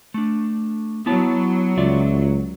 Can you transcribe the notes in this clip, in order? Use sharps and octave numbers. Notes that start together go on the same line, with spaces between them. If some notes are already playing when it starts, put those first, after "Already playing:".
A3 D4
F#3 B3 E4 A5
C#2 F4 D5 E5